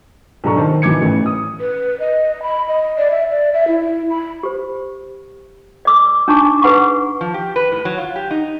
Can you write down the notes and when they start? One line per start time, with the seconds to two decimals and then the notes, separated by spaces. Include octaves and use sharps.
0.44 B1 D4 A4 A#5 C#6
0.56 D#3 C5 A5
0.82 B2 E3 D#4 D6 G#6 C#7
1.01 A1 F#2 A3
1.26 D#6
1.60 B4
2.00 D#5
2.43 B5
2.68 D#5
2.98 D5
3.11 E5
3.31 D5
3.53 E5
3.68 E4
4.10 B5
4.43 G4 C5
5.85 D5 D6 E6
6.28 D4 D#4 G#5 A5 C#6 D6
6.62 G#4 B4 F#5 B5 C#6
7.21 F3
7.34 G4
7.56 B4
7.72 A2
7.85 F#3
7.98 F4
8.16 G4
8.31 D#4